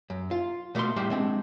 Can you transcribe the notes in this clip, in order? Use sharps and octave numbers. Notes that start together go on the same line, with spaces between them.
F#2
F4
B2 A3 A#3 A4 F5 C6
A2 G3 G4 C5 E5
G#3 C4 D4